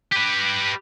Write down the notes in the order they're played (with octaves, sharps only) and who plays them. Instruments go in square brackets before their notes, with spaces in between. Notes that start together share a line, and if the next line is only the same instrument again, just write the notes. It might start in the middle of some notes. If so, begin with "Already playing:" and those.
[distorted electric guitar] G4 B4